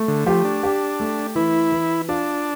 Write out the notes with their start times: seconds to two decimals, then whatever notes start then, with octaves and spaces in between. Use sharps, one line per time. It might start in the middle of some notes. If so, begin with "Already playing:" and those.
Already playing: A3
0.08 D3
0.26 F3 G4
0.45 D4
0.63 G4
1.00 A3
1.35 E3 E4
1.72 E3
2.09 D4 F4